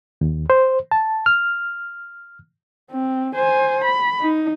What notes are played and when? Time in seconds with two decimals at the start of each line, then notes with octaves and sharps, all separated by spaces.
0.21 D#2
0.50 C5
0.91 A5
1.26 F6
2.92 C4
3.35 C5 G#5
3.84 B5
4.22 D#4